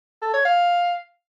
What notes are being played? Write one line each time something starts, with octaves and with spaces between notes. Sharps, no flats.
A4
C#5
F5